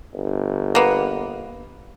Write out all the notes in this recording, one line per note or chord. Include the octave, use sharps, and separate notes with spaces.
G1
A#3 B3